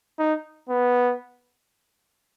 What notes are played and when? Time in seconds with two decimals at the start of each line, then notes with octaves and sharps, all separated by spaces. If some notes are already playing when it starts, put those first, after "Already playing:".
0.19 D#4
0.69 B3